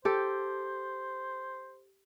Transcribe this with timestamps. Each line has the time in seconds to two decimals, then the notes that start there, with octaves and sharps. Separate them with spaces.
0.05 G4 A4 C5